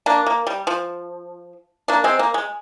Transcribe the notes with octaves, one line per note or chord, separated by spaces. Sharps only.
A#3 D4
A#3
G3
F3
A#3 D4
G#3 C4
A#3
G#3